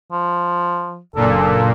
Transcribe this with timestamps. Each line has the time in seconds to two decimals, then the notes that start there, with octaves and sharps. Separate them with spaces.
0.12 F3
1.16 F#1 A#2 D4 A4